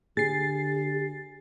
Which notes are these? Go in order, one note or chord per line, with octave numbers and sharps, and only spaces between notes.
D3 G4 G#4 A6 C7